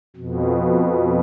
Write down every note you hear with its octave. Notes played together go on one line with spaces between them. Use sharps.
F2 B2